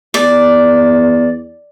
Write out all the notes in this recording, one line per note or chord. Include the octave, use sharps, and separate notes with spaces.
E2 D5